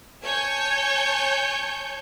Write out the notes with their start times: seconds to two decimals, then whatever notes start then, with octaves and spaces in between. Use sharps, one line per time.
0.22 C#5 G#5 A5 C#6 G6